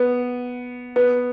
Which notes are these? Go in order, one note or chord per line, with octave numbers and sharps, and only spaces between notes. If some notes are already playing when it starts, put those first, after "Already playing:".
Already playing: B3
B3